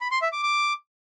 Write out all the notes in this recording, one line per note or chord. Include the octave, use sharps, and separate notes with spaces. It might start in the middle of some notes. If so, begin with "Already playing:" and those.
B5
C6
E5
D6
D6